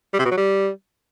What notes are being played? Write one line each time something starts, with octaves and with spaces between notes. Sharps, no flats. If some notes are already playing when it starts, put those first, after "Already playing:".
G3
C3
B2
F#3
G3